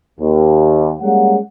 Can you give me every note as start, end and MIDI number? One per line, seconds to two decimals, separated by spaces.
0.20 0.93 39
1.01 1.37 55
1.01 1.37 56
1.01 1.37 58
1.01 1.37 61
1.01 1.37 78